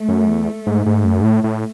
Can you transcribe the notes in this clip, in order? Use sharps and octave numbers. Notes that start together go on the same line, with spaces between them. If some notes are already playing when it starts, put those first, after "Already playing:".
Already playing: A3
F#2
E2
G#2
G#2
F#2
G#2
A2
A2